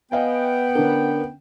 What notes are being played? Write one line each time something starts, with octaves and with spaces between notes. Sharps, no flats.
B3 D#5 F5 G5 G#5
D3 C#4 D4 A#4